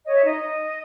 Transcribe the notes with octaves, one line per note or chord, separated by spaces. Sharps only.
C#5 D#5
E5
D#4 D#5